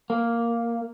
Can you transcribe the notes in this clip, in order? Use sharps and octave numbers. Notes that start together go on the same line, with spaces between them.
A#3